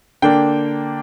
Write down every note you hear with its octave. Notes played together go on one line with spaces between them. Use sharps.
D3 A#3 D4 G5